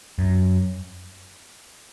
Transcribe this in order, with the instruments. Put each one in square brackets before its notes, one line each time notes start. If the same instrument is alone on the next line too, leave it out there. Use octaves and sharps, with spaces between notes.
[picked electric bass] F#2